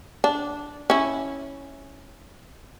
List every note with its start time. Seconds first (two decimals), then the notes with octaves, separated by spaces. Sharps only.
0.24 D4
0.90 C#4 E4